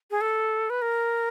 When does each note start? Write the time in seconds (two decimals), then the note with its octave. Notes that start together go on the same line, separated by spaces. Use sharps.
0.11 G#4
0.21 A4
0.70 B4
0.82 A#4